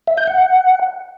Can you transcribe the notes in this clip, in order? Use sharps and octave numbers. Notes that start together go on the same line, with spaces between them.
E5
G6
F#5